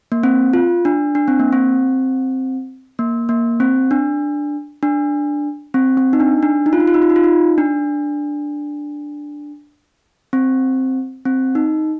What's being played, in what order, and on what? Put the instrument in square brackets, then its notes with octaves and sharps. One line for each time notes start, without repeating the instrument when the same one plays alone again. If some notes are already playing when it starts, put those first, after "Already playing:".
[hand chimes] A#3
C4
F4
D4
D4
C4
A#3
C4
A#3
A#3
C4
D4
D4
C4
C4
D#4
D4
D4
D#4
F4
D#4
F4
D#4
F4
D#4
F4
D#4
D4
C4
C4
D#4